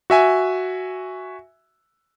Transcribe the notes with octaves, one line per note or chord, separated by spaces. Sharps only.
F#4 E5 G#5